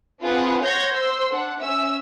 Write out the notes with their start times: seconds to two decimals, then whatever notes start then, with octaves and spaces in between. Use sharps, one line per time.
0.22 C4 D4 F4 G#4 B4 F#5
0.62 C#5 F#5 C6 G6 G#6 A#6
0.94 C5 C6 E6
1.30 D4 F#5
1.59 C#4 E5 E6